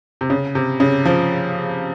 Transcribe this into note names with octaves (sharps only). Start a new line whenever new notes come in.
C3
C#3
C3
C#3
F3